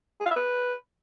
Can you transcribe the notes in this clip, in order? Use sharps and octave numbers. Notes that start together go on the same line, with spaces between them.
G#4
F5
E5
B4